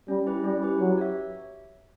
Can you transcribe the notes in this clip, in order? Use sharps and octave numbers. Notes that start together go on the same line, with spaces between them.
G3 C#4
E4 G4 B4
G3 C#4
E4 G4 B4
F#3 G4
C#5 E5